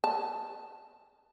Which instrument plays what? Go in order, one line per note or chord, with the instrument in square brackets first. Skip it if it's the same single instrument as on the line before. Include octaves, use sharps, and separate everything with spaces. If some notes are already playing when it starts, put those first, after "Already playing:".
[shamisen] A5